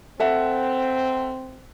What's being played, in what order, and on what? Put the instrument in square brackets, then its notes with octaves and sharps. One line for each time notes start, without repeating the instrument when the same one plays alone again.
[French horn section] C4 [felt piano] A4 E5 F#5